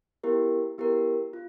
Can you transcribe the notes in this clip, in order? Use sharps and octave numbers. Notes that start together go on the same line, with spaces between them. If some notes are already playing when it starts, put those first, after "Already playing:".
B3 E4 G4 A#4
B3 E4 G4 A#4
F4